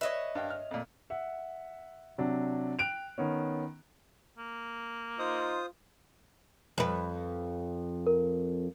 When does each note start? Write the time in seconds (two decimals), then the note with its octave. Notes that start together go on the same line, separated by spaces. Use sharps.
0.01 B4 C#5 D#5 E5
0.35 G2 F5 G5
0.50 F6
0.71 F2 A#2
1.10 E5 F#5
2.18 C3 F#3 D4
2.79 G5 F#6 D7 F7
3.18 D#3 B3 C#4
4.38 A#3
5.19 D#4 F4 C5 D#6
6.78 F2 B4
8.07 A#4